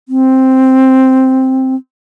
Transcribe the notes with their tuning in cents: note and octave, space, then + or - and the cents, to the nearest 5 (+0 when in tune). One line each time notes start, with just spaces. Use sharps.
C4 +0